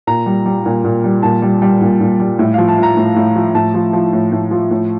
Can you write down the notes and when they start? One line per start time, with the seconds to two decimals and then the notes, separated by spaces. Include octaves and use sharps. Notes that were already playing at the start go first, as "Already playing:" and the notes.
0.07 A#2 A#5
0.26 G3
0.46 G3
0.66 A#2
0.84 A#2
1.04 G3
1.23 A#2 A5
1.42 G3
1.62 G3
1.81 A#2
2.01 A#2
2.20 G3
2.39 A2
2.54 F3 F5
2.68 A5
2.78 F3
2.83 A#5
2.97 A2
3.16 A2
3.36 F3
3.55 A2 A5
3.74 F3
3.93 F3
4.13 A2
4.32 A2
4.51 F3
4.71 A2